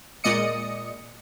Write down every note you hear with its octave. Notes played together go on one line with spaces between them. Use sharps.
A#2 G#3 D5 D#5 D#6 C#7